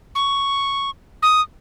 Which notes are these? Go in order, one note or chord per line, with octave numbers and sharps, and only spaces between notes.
C#6
D#6